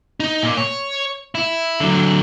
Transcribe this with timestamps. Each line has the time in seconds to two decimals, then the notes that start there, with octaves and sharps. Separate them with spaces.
0.20 D#4
0.43 A#2
0.57 C#5
1.35 E4
1.80 D3 F#3